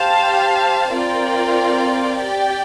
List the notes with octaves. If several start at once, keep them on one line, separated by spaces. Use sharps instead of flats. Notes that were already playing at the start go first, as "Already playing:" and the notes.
Already playing: G4 C5 F5 A5
C4 F4 A#4 D5 G5
G4 D5 G5